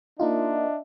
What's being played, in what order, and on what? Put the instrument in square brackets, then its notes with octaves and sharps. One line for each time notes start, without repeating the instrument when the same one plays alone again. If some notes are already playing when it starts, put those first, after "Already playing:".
[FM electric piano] A#3 D#4 F4 [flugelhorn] D4 [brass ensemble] D#5 E5